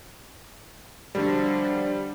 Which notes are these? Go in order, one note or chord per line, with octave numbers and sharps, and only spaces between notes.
D3 F3 G3 F#4